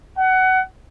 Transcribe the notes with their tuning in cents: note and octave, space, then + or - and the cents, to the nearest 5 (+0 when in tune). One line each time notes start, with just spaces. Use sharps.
F#5 +20